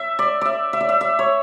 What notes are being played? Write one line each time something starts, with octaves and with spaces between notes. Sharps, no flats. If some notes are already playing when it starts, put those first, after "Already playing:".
Already playing: E5
D5
D5 E5
E5
D5
E5
E5
C#5